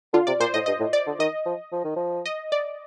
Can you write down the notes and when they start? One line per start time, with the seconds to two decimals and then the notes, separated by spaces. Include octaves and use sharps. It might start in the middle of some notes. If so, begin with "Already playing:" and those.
0.14 D3 F4
0.27 C3 D5
0.40 A#2 C5
0.54 A2 D#5
0.66 G2 D#5
0.80 A2
0.93 D5
1.06 D3
1.19 D#3 D#5
1.46 F3
1.72 F3
1.84 D#3
1.96 F3
2.26 D#5
2.52 D5